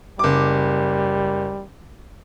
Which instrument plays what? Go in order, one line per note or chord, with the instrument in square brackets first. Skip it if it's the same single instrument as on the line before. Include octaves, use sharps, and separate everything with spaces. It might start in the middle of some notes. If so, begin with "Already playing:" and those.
[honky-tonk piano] F#1 D6 [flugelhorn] G3